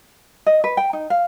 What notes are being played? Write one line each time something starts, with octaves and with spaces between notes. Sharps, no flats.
D#5
B4
G5
D#4
F5